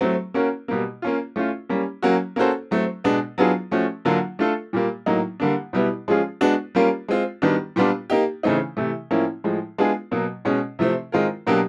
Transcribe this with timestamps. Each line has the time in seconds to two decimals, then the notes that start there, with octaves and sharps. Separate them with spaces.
0.01 F#3 A3 C4
0.34 A#3 C#4 F#4 A#4
0.68 B2 G3 A#3
1.02 A#3 C#4 F4
1.36 A3 C#4 F4
1.69 G3 A#3 C#4
2.03 F#3 A#3 C#4 F#4
2.36 A#3 C#4 F#4 A4 C5
2.71 F#3 A3 C4
3.04 B2 G#3 B3 D4
3.38 F#3 B3 D4 F4 G#4
3.71 F3 A3 C#4 F#4
4.05 D3 F#3 A#3 D4 F4
4.39 A3 D4 F4 A4
4.73 A#2 G3 A#3
5.06 A2 F#3 A#3 D#4
5.40 D3 G3 A#3 D4
5.73 B2 G3 B3 E4
6.08 F3 G#3 C#4 F4 G#4
6.41 G#3 B3 D4 F#4
6.75 G3 A#3 C#4 F4 A#4
7.08 G#3 C4 F4
7.42 D#3 G3 B3 D4 F#4
7.76 A#2 G3 B3 D4 F4
8.10 A#3 D#4 G4
8.43 C#3 E3 A3 C4 D#4
8.77 C3 E3 A3
9.11 A2 F3 A#3 C#4 E4
9.44 A2 F3 G#3
9.78 G#3 B3 D4 F4 G#4
10.11 B2 F#3 A#3
10.45 B2 G#3 C#4
10.79 C3 F3 A3 C4
11.12 D#3 G#3 C4 F4 A#4
11.47 B2 F#3 A#3 D4 G4